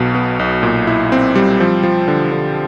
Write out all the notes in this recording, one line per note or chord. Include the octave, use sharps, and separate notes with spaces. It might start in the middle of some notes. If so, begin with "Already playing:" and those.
Already playing: B1 B2
B3
B1
A#2
E4
C4
G3
F3
F3
D3
D3